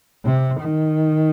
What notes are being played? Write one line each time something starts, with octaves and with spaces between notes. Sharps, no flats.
C3
D#3